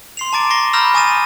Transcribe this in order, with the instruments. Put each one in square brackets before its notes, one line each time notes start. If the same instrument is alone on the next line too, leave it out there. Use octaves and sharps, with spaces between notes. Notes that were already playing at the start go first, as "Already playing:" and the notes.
[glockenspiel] C6 C7 F7
A5 A#5 D6 A6 D7
A#5 C#6 A6 A#6 C7 G7
A#5 B5 E6 F6 G6 A#6
G#5 C#6 D#6 A6 D#7 E7